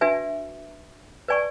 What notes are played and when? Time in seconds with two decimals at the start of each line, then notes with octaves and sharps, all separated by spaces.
0.01 D4 F#4 B4 E5 G#5
1.28 B4 D5 G#5 C#6